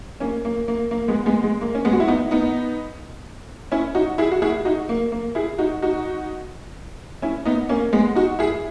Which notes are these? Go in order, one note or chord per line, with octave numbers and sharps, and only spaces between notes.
A#3 C#4
A#3
A#3
A#3
G#3 B3
G#3 B3
G#3
A#3
C#4
G#3 B3
F#4
E4
B3 D#4
B3 D#4
C#4 E4
D#4 F#4
E4 G#4
F#4
E4 G#4
D#4 F#4
A#3
A#3
E4 G#4
D#4 F#4
D#4 F#4
C#4 E4
B3 D#4
A#3 C#4
G#3 B3
D#4 F#4
E4 G#4